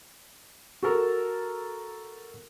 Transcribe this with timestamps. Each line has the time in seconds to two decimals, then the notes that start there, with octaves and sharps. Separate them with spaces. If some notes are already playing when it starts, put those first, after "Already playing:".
0.83 F#4 A4 A#4